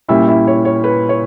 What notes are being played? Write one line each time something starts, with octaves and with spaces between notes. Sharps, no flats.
A#2 G3 C#4 E4 E5
E4 E5
C#5
C#5
B4
C#5